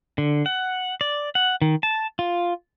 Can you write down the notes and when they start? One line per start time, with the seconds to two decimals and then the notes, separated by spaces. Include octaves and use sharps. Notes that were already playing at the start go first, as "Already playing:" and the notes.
0.18 D3
0.46 F#5
1.01 D5
1.35 F#5
1.62 D#3
1.83 A5
2.19 F4